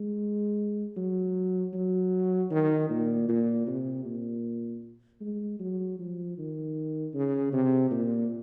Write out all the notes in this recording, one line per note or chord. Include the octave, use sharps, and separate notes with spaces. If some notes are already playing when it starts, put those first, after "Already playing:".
Already playing: G#3
F#3
F#3
D#3
A#2
A#2
C3
A#2
G#3
F#3
F3
D#3
C#3
C3
A#2